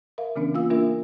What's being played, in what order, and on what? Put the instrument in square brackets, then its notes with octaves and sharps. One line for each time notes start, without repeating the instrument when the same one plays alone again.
[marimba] A#4 E5 F5
C#3 E3 B3 C#4 D4
A#3 F4 F5 E6
A#3 D4 F4 A#4 E5